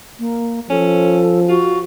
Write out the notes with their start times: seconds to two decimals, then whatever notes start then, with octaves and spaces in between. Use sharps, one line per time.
0.19 A#3
0.70 F3 C#4 A4
1.49 F4 F#4